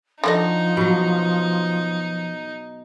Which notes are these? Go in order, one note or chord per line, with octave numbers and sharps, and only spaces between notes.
D3 F3 D#4 F#4 D#5
B2 F#3